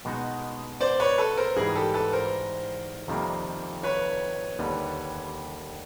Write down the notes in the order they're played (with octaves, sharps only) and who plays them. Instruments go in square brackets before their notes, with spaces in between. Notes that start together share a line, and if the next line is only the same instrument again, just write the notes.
[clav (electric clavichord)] B2 G#3 B3 D#4 F#4
[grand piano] C5 D5
B4 C#5
A4 B4
A#4 C5
[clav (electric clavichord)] G#2 E3 G3 [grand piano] G#4 A#4
[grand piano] G4 A4
A4 B4
A#4 C5
[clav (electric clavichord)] F2 C3 D#3 G3 A#3
[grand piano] B4 C#5
[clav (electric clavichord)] D#2 D3 G3